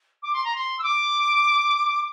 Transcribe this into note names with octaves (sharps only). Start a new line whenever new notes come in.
D6
C6
A#5
C6
E6
D6